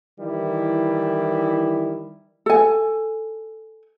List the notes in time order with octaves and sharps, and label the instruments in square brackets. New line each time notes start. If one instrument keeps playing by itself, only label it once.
[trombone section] D#3 E3 G3 E4
[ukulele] A4 G#5